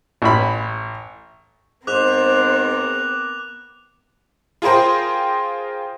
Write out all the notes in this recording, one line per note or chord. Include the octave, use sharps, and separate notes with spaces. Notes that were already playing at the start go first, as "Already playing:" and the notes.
A1 B5
G#2 B3 C4 A#4 C5 D6 F#6 F7
F4 G#4 A#4 C5 G5